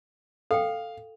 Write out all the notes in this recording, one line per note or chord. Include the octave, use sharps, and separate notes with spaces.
A4 F5 G5